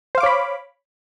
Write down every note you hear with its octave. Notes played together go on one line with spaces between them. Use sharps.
C5 C#5 F5 B5 D6